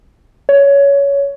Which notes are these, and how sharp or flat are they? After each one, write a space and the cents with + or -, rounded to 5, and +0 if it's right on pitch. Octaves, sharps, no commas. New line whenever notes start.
C#5 +15